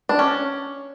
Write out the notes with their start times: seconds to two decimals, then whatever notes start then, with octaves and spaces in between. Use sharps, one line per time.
0.09 D4
0.19 C#4